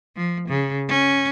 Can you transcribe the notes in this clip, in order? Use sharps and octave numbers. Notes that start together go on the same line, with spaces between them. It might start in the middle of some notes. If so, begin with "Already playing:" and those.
F3
C#3
C#4